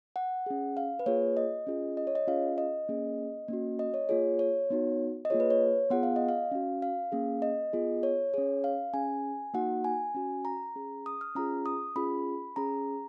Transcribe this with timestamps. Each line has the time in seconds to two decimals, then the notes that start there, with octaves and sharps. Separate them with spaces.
0.16 F#5
0.46 C#4 G#4
0.77 F5
0.99 B4
1.06 A#3 F4 G#4 C#5
1.37 D#5
1.67 C#4 F4 G#4
1.97 D#5
2.07 C#5
2.15 D#5
2.27 C#4 F4 G#4 F5
2.58 D#5
2.89 A#3 C#4 G#4
3.48 A#3 C#4 F#4
3.79 D#5
3.94 C#5
4.09 A#3 F4 G#4 C#5
4.39 C#5
4.70 B3 D#4 F#4
5.25 D#5
5.30 A#3 F4 G#4 C#5
5.40 B4
5.50 C#5
5.90 B3 F4 G#4 F#5
6.03 F5
6.16 D#5
6.29 F5
6.51 C#4 F#4
6.82 F5
7.12 A#3 C#4 G#4
7.42 D#5
7.73 B3 F4 G#4
8.03 C#5
8.34 C#4 G#4 C#5
8.64 F5
8.93 C#4 G#4 G#5
9.54 A#3 D#4 F#4 F#5
9.84 G#5
10.15 C#4 F#4
10.45 A#5
10.76 C#4 G#4
11.06 D#6
11.21 F6
11.35 C#4 F4 G#4 A#5
11.66 D#6
11.96 C#4 F4 G#4 B5
12.56 C#4 G#4 A#5